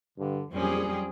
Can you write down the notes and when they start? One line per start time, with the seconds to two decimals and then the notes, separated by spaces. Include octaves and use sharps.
0.18 G2 D3
0.53 A#1 F2 F#3 G3 C4 C#4 G4 G#4